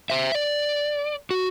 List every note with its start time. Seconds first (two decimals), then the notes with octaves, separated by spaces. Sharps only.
0.10 C5 E5
0.35 D5
1.31 F#4